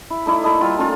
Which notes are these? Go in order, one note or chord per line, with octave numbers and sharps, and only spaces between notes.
E4
A3 D#4 E4 D5
A#3 E4 A4 D#5
G3 F4
A3 C#4 D#4 F4